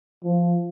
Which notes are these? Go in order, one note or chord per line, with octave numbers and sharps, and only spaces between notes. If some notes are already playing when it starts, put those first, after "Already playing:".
F3